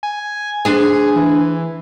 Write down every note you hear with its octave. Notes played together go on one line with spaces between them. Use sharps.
G#5
D2 D4 G#4 G#5
E3